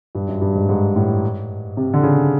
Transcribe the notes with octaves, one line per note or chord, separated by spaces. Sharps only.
G2
F#2
G2
G#2
G#2
A2
C3
D3
C#3